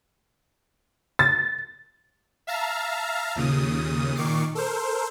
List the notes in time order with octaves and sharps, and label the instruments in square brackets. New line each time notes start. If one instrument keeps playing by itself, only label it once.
[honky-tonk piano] A6
[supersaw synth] E5 F5 A5 A#5
D#2 A#2 C#3 D#6
A#2 D#3 C#6 D6 C7
A4 A#4 C5